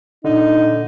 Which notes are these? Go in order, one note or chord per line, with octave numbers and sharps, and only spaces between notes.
A#2 D3 D#4